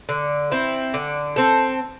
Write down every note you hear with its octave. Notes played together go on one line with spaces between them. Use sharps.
D3
C4 E4
D3
C4 A4